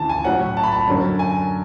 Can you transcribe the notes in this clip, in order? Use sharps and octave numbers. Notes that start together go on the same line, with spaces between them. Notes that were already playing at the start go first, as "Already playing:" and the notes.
Already playing: D2 C#3 E3 A5
G#5
A2 F#3 C#4 F#5
A5
B5
A5
F#2 D3 F#3 C#4
G#5